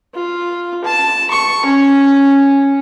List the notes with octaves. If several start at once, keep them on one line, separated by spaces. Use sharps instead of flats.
F4
A5
C#6
C#4